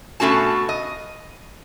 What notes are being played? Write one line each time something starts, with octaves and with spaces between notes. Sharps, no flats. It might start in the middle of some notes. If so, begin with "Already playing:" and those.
B2 A3 C#4 F#4 A5
D#5